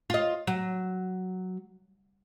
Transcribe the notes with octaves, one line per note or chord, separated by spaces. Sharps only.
F4 D#5
F#3